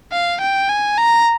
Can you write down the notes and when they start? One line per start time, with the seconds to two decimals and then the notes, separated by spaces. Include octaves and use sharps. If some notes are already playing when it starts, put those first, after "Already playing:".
0.12 F5
0.41 G5
0.69 G#5
0.97 A#5